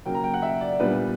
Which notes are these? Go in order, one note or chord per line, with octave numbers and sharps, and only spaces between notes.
C#3 F#3 A#3 G5
A#5
G5
F#5
E5
D5
A#2 G3 B3 D4 B4